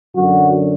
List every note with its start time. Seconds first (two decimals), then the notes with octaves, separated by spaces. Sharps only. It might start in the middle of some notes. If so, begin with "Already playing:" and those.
0.14 F#2 D3 F#3 F#4